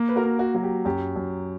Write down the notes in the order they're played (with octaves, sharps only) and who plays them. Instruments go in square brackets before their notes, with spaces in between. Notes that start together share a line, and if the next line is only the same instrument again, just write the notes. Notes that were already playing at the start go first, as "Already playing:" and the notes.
Already playing: [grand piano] A#3
[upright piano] B4
F#4 A#4
[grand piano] A#3
[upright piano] F#4
[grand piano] F#3 [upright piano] F#4
[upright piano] G4
[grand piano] F#2 [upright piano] G4
[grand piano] F#2